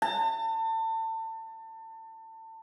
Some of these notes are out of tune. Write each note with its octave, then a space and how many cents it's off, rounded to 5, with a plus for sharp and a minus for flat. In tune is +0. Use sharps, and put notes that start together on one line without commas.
A5 +30